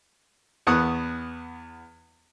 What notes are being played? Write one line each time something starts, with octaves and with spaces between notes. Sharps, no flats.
E2 B3 F#5 C#6 D#6